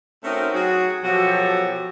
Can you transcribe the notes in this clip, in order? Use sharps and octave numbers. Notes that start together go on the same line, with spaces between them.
A3 C4 C#4 D#4 F#4 A#4
F#3 F#4 G#4
B2 F3 F#3 F#4 G4 A4